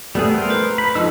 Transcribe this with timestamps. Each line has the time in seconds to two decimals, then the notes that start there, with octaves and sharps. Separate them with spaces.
0.15 G3 A3 B3 G#4
0.31 A#4 C5
0.50 B4
0.78 B5
0.95 F2 F3 D#4 F#4 E6